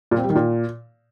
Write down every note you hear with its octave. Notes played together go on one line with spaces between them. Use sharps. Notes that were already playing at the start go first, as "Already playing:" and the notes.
A#2
C4
G3
D#3
A#2